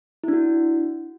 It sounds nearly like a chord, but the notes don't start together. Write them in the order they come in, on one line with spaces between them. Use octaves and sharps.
E4 D4 F#4